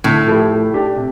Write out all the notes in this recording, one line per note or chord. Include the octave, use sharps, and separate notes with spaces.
A2 D3
F3 A3 E4 G4
A3
D4 G4 D5
C3